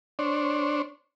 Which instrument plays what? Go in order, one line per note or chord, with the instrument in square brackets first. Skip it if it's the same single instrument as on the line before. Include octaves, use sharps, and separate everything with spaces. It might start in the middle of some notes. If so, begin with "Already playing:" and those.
[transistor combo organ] D4 C5 C#5